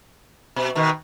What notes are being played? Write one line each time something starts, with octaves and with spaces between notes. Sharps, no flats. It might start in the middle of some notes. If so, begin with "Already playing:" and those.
B2
B2 D#3